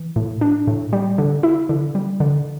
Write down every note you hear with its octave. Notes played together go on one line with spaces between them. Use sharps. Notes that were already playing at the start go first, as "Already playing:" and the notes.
Already playing: E3
A2
D4
A2
G3
D3
E4
D3
G3
D3